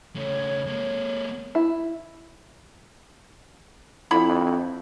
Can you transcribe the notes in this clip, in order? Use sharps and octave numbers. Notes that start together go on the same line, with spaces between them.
C#3 A3 C#5
G#3 A#3
E4
F2 D3 E4 B5